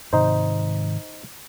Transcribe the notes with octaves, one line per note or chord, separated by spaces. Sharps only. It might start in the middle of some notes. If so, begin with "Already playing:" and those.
G#2 C3 D#3 D#4 C5